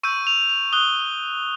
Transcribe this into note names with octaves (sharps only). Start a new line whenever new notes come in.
C#6 E6 G6 D#7
F7
F7
D#6 F#6 G7